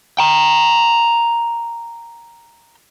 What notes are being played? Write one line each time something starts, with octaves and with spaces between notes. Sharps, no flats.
G5 A#5